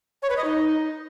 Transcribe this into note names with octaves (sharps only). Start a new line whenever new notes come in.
C#5
B4
D#5
D#4